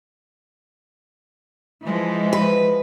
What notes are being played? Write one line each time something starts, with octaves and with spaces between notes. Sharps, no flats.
E3 F3 G#3
B4